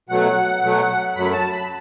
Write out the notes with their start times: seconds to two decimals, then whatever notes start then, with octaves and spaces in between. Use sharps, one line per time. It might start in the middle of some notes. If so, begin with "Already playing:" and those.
0.09 B2 F#3 A3 F#5
0.63 B2 F#3 A3
1.15 F#2 F#3 A3 B5
1.33 A5
1.51 B5